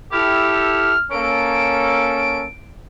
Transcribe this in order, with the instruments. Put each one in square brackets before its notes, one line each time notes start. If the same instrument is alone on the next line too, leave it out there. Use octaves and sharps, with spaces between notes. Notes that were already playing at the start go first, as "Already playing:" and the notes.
[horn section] E4 G4 A4 [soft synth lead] F6
[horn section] A#3 C#4 A4 [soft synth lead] D7